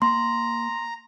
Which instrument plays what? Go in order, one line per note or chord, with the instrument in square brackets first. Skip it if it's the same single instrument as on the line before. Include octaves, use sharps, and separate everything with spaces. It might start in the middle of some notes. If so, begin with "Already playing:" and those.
[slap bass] A#3 [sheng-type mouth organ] A#5 [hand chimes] C6